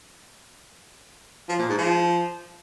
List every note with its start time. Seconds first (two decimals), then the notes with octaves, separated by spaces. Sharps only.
1.49 F3
1.59 A#2
1.68 G#2
1.78 F3